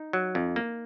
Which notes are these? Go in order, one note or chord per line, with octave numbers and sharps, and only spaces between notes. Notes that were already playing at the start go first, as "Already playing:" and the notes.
Already playing: D#4
F#3
F2
A#3